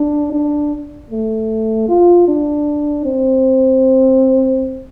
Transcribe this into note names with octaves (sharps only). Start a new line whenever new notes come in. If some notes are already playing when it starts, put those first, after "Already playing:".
Already playing: D4
D4
A3
F4
D4
C4